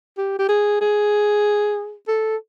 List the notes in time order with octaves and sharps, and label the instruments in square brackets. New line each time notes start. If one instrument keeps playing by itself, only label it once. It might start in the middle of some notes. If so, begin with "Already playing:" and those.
[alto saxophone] G4
G4
G#4
G#4
A4